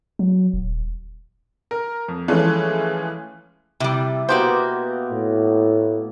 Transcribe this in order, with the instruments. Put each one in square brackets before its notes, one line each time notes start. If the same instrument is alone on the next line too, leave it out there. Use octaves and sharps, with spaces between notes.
[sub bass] F#3
D#1
[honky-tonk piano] A#4
F2
E3 F3 G#3 A3 C#4
[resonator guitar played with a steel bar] C3 G3 [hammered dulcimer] E4 E5
[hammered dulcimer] B2 A#3 B3 [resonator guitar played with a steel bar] F#4 G4 C5
[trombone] A2